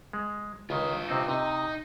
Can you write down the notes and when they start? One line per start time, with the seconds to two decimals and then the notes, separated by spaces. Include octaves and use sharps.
0.13 G#3
0.70 C#2 D#3 F4 B4
1.08 C3 C4 D#4
1.29 C3 D#4